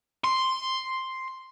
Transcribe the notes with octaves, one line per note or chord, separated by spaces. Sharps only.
C6